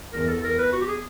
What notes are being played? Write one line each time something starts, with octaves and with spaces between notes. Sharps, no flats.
E2 A#4
A4
A#4
B4
F#4
G4
G#4